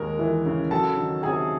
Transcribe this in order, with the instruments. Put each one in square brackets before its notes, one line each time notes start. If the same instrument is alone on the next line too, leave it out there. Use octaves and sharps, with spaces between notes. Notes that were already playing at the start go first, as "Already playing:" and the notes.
Already playing: [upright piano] D#2 G#3 A#4
E3
C#3
F#3 A4 A5
D#3
C3 G#4 G#5